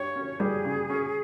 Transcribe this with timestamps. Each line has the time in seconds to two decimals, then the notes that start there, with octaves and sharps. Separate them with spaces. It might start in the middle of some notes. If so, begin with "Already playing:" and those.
Already playing: G2 G4 C#5
0.16 C#4
0.40 G3 G#4
0.65 C#3
0.90 C#4